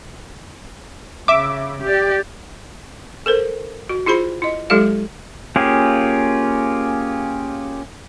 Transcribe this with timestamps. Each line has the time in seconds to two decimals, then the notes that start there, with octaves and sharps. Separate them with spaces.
1.28 C#3 E5 D6
1.83 G4 D5
3.26 A4 A#4 C5
3.89 F#4
4.06 E4 F4 G#4 C5 B5
4.42 E4 D#5
4.70 F#3 G#3 E4 G4 A4 F5
5.56 A#3 C#4 F4 G4 G#4